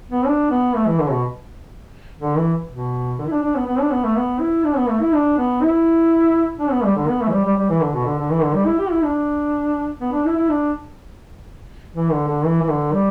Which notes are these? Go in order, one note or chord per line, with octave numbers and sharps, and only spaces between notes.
B3
D4
B3
A3
E3
D3
B2
D3
E3
B2
D3
E4
D4
D4
B3
B3
D4
B3
A3
B3
E4
D4
B3
A3
E4
D4
B3
E4
D4
B3
G3
D3
B3
A3
E3
G3
G3
G3
E3
D3
B2
D3
D3
E3
D3
G3
E4
G4
E4
D4
B3
D4
E4
E4
D4
E3
D3
D3
E3
E3
D3
G3